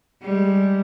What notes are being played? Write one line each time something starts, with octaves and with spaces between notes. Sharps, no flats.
G3 G#3